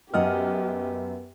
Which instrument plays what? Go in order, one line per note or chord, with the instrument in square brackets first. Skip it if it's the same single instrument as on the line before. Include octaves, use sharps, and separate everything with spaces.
[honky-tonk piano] F#2 F6 [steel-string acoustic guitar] G3 D#5 F#5 [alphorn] B3 [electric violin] G4